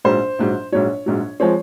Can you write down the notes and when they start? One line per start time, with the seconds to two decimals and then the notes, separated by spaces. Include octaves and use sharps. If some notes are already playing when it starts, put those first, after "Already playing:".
0.05 A#1 G#2 F#3 C5
0.39 A#1 G#2 F#3
0.72 A#1 G#2 F#3 C#5
1.06 A#1 G#2 F#3
1.40 F3 G#3 C4 C#5